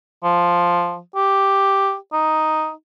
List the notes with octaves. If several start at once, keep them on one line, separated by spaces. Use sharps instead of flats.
F3
G4
D#4